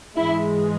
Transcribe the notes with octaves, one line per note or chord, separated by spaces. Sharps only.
G#2 E3 G#3 E4